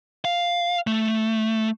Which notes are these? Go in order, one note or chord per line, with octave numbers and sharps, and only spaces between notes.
F5
A3